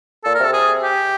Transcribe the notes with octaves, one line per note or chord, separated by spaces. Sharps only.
A#2 A4
A#4
C3 A4
G#4
G4